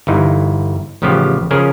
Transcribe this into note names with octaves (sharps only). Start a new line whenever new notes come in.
G1 E3 D#4
A1 C#3 F3 B3 G4
C#3 F3 C#4 G#4 A#4